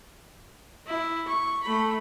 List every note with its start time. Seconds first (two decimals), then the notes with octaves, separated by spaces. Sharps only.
0.86 E4
1.28 C#6
1.63 A3 B5